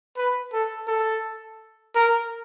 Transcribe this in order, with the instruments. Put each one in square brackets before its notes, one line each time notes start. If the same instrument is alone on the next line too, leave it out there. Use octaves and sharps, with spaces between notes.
[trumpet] B4
A4
A4
A#4